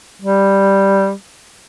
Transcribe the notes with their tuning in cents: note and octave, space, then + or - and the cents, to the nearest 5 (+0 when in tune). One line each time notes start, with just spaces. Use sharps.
G3 +0